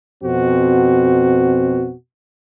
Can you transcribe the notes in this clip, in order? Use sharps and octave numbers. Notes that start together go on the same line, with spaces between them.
F2 B2 C4 F#4